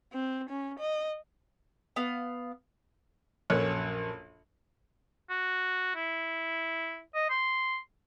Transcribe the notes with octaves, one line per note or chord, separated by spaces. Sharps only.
C4
C#4
D#5
B3 F5
A#1 F#2 A4 C#5 F6 F#6
F#4
E4
D#5
C6